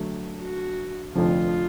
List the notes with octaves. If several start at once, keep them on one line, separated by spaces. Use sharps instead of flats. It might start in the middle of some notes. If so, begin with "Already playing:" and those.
Already playing: D3 F#3 A3
F#4
F1 F2 D3 F3 F4